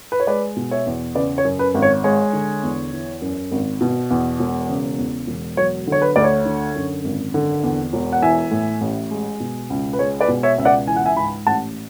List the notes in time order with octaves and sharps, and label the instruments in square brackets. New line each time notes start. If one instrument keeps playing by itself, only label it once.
[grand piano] B4
C#5
G#3 B4 D5
B2
C#5 E5
E2
C#3 B4 D5
C#5
F#2
B4
G#1
C#5
G#3 C#5
D3
E2
E3
F#2
G#1
B2
E2
E1
C#3
E2
E1
F#3 C#5
D3 C#5
B4
D2 D5
C#5
D3
F#2
G#1
D3
E2
E1
F#5
E3 E5 G#5
A2
A1
G#3
B2
C#2
B4
G#3 C#5
B4 D5
B2
C#5 E5
C#2 E5
D5 F#5
E3 G#5
F#5
E5 G#5
G#2 G#5 B5
A1 F#5 A5